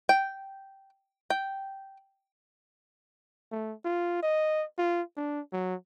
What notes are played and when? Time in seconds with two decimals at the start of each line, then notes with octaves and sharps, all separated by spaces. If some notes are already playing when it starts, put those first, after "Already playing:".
0.09 G5
1.30 G5
3.52 A3
3.85 F4
4.23 D#5
4.78 F4
5.17 D4
5.52 F#3